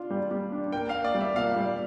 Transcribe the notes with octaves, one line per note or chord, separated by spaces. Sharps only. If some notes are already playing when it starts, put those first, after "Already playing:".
Already playing: D4 F4
G3
G3
D4
A#3 G5
F5
A#3
D5
G3
E5
A#2 F5
G3